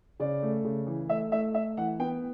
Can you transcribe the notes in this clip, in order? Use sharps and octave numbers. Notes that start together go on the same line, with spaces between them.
C#3 D5
A3
C#3
E3
A3 E5
A3 E5
A3 E5
E3 F#5
B3 G5